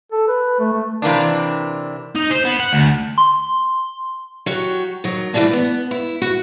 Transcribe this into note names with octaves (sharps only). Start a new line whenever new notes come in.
A4
B4
A3
A3
C3 E3 A#3 D4
D#4
C5
B3
F#5
D2
C6
F#3 F#4 G4
D#3 F#3
A2 E3 F3 G3 D4 A5
B3
E4
F#4